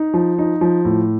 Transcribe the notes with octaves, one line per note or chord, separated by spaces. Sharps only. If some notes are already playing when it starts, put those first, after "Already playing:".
Already playing: D#4
F3
D#4
F3
A2